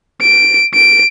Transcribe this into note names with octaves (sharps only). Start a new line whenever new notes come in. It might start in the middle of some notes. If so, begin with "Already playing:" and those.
D7
D7